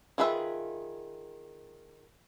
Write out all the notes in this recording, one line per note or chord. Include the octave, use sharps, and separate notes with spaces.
D#3 F4 G#4 B4 E5